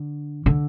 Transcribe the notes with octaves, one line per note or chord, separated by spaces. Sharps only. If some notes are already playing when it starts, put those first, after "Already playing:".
Already playing: D3
D3